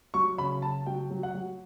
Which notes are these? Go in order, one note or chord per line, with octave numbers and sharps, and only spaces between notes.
F#3 C#6
C#3 B5
C#3 A5
F#3 G5
F#3
F#5
F#3